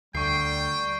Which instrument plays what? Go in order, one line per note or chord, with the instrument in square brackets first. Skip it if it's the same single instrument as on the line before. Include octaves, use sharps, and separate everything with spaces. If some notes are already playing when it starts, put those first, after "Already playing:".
[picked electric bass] D2 [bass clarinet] G3 [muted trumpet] G5 [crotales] C#6 C7